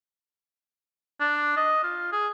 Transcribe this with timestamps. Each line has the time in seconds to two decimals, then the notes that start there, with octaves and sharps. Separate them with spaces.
1.20 D4
1.57 D#5
1.83 F4
2.13 G#4